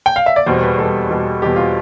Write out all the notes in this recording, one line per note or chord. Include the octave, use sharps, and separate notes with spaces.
G5
F5
E5
D5
E2 B2 G3 C5
B4
E2 B2 G3 A4
E2 B2 G3
E2 B2 G3 G4
F4